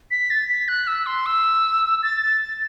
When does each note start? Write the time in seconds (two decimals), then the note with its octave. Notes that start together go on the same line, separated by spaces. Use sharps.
0.11 B6
0.30 A6
0.49 B6
0.68 F#6
0.87 E6
1.06 C6
1.26 E6
2.03 A6
2.21 A6
2.41 A6